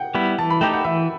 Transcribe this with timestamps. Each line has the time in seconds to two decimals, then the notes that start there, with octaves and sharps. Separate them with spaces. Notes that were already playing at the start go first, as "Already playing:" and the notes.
Already playing: F#5 G5
0.15 G3 B3 E4
0.38 E3 A5
0.50 B5
0.61 A3 D#4 G4 G5
0.73 F#5
0.84 E3 E5